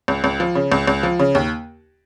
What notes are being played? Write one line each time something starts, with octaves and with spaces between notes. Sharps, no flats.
C#2
C#2
F3
C#3
C#2
C#2
F3
C#3
D#2